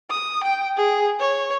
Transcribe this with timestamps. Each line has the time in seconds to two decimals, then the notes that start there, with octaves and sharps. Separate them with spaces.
0.10 D#6
0.44 G5
0.77 G#4
1.20 C#5